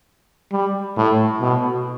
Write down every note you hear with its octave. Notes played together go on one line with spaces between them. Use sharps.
G3
A2
B2